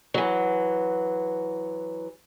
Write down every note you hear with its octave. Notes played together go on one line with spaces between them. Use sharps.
E3 F#3